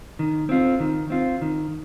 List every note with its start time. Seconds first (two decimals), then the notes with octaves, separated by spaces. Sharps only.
0.19 D#3
0.49 C4 F4
0.80 D#3
1.10 C4 F4
1.42 D#3